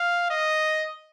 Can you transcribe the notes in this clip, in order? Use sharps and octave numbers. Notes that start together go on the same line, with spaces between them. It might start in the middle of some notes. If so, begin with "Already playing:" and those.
Already playing: F5
D#5